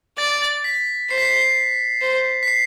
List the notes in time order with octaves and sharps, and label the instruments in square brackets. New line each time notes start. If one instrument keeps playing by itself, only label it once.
[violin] D5 [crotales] A6
[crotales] A6
B6
[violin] C5 [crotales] C7
[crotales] B6
C7
C7
[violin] C5
[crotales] B6
C7